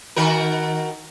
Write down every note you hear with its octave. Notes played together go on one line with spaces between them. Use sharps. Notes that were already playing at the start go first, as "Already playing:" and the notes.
D#3 F#4 A#4